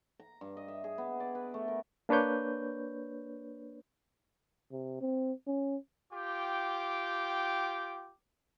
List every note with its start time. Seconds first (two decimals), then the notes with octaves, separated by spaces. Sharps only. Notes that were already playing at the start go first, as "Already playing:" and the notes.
0.20 A#5
0.41 G2
0.57 D#5
0.68 E5
0.84 G#4
0.98 B3
1.20 D5
1.35 B4
1.54 A3
1.68 A#4
2.09 A#3 D4 B4 C#5 G6
4.71 C3
5.01 C4
5.47 C#4
6.13 F4 G4 G5 D6